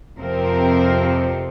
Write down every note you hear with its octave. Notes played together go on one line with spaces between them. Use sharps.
F2 C3 F3 C4 A#4